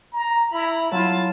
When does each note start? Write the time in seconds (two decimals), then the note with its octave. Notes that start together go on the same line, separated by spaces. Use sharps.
0.13 A#5
0.52 E4 A#5 B5
0.92 F#3 E4 F4 A5